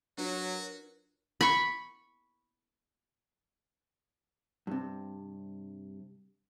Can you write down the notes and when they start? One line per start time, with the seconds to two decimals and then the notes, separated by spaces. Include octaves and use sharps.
0.18 F#3 D4 F4 F#4 A#4 B4 C#5
1.41 B5 C#6
4.67 G2 C3